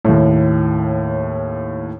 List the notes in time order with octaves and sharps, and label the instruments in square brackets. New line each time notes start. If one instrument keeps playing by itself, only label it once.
[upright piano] D#2 A2